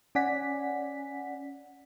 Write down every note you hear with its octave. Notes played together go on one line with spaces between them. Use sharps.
C#4 D5 F#5 G#5 B6